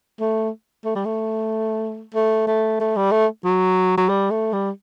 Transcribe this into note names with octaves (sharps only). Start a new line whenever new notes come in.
A3
A3
G3
A3
A3
A3
A3
G3
A3
F#3
F#3
G3
A3
G3